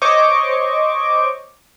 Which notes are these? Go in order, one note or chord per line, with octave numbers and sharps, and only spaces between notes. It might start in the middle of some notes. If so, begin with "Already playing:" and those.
C5 C#5 D#5 C#6 D6